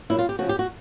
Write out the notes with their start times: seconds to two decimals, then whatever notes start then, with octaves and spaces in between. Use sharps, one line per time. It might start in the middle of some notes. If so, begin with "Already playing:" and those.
0.10 A#2 F#3 E4
0.19 F4
0.29 G4
0.39 C#3 F3 F#4
0.49 G4
0.59 F#4